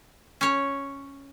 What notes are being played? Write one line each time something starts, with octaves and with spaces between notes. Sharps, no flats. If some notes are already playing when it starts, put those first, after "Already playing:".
C#4 C#5